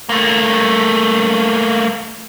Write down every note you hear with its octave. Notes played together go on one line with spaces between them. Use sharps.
A3 A#3